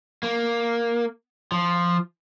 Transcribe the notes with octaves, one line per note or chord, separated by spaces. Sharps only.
A#3
F3